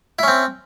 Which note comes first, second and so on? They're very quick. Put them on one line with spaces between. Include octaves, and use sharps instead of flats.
E4 C#4 C4